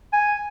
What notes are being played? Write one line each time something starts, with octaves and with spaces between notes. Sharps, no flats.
G#5